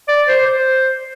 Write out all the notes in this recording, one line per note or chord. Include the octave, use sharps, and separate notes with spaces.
D5
C5
C5